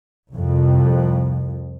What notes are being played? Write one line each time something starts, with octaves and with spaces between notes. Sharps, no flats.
C2 F2